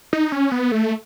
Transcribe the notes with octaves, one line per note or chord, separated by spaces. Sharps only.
D#4
C#4
B3
A3